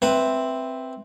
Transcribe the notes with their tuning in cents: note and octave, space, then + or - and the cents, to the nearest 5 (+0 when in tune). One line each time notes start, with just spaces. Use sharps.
C4 +0 B4 +0 E5 +0